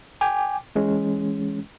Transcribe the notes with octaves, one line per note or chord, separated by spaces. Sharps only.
G5 G#5 D6
E3 G#3 C#4